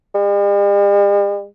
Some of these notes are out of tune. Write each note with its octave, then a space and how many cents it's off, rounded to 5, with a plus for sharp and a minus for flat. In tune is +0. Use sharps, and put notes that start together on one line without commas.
G3 +45